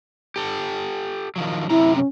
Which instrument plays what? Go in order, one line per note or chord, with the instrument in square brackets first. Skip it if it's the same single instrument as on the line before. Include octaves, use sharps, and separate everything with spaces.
[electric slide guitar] G4 A4
D#3 F3 F#3
[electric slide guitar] F#2 C3 A#5 [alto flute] E4
[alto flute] C#4